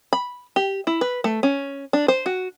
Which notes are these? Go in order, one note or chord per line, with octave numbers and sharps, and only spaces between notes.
B5
G4
E4
B4
A3
C#4
D4
C5
F#4